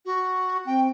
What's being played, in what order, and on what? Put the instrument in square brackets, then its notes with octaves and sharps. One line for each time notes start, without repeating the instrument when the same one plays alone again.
[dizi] F#4
[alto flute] C4 [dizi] G5